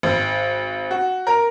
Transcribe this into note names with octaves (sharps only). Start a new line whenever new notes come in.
G#1
F#4
A#4